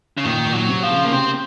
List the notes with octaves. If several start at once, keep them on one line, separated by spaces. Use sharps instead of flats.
C#3
A#2 D#3
A#2
F#3
C3
F3
C#3
A#3
C3 C4